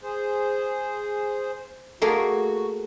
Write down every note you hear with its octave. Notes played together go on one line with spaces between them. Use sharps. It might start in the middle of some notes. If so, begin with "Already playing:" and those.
G#4 C5
A3 A#3 F#4 G#4